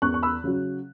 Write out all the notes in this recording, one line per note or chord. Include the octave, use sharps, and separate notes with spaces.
E2 C#6 F#6
C#6
B5 E6
C#3 F#3